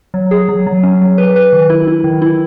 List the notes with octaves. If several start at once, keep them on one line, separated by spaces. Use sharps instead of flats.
F#3
G#4
F#3
F#3
C#4
F#3
B4
B4
D#3
E4
E4
D#3
E4